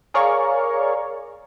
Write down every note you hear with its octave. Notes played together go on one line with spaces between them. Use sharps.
G#4 A#4 C#5 D5 F5 C#6